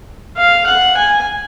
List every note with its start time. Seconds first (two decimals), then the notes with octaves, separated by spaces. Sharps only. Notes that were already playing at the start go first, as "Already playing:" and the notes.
0.37 F5
0.67 F#5
0.97 G#5